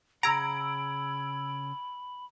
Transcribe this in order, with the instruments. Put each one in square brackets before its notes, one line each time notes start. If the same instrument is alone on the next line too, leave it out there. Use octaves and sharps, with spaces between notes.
[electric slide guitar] C#3 G#4 F#5 [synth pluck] A#5 [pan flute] B5 [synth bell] E6 G#6 D7